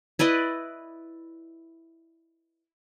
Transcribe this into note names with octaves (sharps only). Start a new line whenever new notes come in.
E4 B4 D5 D#5